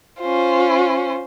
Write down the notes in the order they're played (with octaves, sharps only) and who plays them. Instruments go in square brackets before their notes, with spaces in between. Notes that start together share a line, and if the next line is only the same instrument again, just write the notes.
[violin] C#4 C5 [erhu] F4